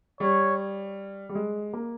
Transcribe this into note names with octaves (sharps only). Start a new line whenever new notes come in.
G3 C#5
G3
G#3
A#3